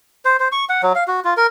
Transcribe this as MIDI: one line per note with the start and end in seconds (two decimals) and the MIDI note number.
0.25 0.37 72
0.40 0.48 72
0.52 0.65 85
0.69 0.82 78
0.83 0.93 54
0.95 1.04 77
1.08 1.20 66
1.24 1.34 65
1.37 1.47 70